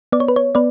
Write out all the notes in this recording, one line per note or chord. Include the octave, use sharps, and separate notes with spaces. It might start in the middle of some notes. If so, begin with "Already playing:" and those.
B3 D5
C#5
B4
C#5
B3 B4 D5